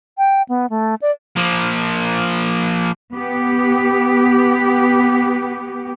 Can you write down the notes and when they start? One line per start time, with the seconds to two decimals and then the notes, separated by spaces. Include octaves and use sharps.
0.18 G5
0.49 B3
0.70 A3
1.02 D5
1.36 F3 A#3
3.14 B3 G4